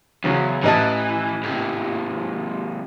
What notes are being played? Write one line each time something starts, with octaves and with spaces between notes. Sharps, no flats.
E2 C#3 F#3
A1 E3 D#5 A5
G#2 C3